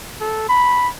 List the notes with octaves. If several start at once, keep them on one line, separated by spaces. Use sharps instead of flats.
A4
B5